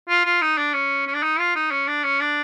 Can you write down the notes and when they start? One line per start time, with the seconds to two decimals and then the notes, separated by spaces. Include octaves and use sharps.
0.09 F4
0.25 F4
0.41 D#4
0.58 D4
0.73 C#4
1.07 C#4
1.15 D4
1.22 D#4
1.39 F4
1.55 D#4
1.71 C#4
1.88 D4
2.04 C#4
2.21 D4